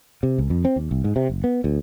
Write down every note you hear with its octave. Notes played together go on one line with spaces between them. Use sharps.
C3
C#2
F2
C4
D#2
C2
G#2
C3
F#1
B3
D2